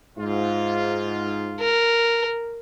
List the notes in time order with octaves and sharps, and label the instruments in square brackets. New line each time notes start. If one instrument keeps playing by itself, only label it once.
[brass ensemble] G#2 F4
[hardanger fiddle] A#4